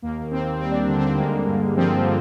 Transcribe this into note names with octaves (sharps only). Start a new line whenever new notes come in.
D#2 A#3
D#2 C4
G3 C4
D4
C4
D3 D4
C4
G#3 A#3
G2
F3 C4
D3